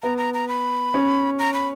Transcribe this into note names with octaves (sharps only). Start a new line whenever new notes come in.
B3 A#5
A#5
A#5
B5
C#4
A#5
B5